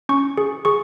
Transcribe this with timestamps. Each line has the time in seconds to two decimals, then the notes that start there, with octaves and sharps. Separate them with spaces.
0.09 C#4 C#6
0.38 G#4
0.65 G#4 C#6